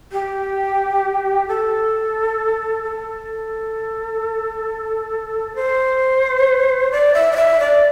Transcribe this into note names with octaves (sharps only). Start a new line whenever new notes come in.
G4
A4
A4
C5
D5
E5
D5
E5
D5